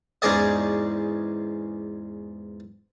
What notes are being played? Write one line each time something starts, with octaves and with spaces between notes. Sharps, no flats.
E2 G#2 C#4 G#4 D5 D#5